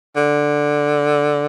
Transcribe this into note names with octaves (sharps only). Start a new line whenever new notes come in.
D3